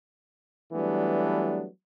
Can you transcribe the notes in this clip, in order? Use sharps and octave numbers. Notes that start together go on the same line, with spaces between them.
E3 F#3 G3 A3 B3 D4